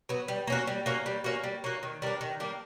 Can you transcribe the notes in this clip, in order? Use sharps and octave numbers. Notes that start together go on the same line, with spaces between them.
F#3 B3
G3
A#3 C#4 F#4
G3
A#3 C#4 F#4
G3
A#3 C#4 F#4
G3
A#3 C#4 F#4
D#3
G3 A#3 D4
D#3
G3 A#3 D4